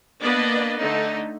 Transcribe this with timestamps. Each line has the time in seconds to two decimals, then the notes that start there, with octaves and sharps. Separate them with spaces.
0.22 A#3 B3 D4 B4 D5 D#5
0.80 D3 A3 D#4